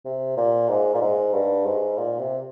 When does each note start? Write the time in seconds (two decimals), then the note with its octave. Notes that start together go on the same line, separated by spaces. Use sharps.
0.05 C3
0.37 A#2
0.68 G#2
0.94 A#2
1.01 G#2
1.33 G2
1.66 G#2
1.97 A#2
2.19 C3